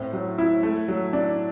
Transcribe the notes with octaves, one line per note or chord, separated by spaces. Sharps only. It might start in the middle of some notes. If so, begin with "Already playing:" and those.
Already playing: A2 C4
F#3
E4
A3
F#3
D4